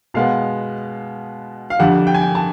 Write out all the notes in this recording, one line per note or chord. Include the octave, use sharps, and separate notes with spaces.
B2 G#3 B3 F5
F5
F2 D3 G3 F#5
G5
G#5
G5
A5